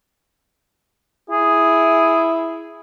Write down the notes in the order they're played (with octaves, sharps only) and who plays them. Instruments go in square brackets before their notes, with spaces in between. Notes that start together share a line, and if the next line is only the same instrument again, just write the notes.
[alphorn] E4 [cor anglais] G#4